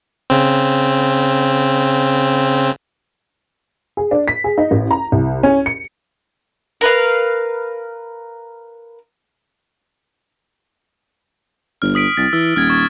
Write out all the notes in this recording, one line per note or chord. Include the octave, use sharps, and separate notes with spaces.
C#3 C4
G#4
D4
B6
G#4
D#4
A1
A#5
C2
C#4
C#7
A#4 B4 F5
G1 F6
D#6 B6 D7
C2 A6
E3 E6
D#1 F6 G#6
C#6 G#6